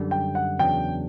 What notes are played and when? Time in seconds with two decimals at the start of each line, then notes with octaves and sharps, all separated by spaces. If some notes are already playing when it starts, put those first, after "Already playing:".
Already playing: F#2 D3 G3
0.11 G5
0.35 F#5
0.59 E2 C#3 F#3 B3 D4 G5